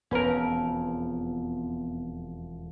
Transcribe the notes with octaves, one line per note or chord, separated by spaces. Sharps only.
E1 F2 B3 C#4 A#4 B4